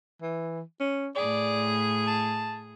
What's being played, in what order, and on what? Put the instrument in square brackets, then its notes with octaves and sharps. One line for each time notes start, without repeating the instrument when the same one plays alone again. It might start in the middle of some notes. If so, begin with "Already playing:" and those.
[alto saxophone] E3
C#4
[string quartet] A2 G#4 [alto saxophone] D5
[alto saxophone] A5